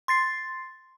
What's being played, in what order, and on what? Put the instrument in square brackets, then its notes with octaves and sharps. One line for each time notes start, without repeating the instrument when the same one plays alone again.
[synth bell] C6 A6 C7